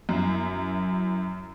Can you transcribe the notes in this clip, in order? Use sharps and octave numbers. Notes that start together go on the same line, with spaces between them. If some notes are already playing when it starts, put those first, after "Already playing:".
F#2 E4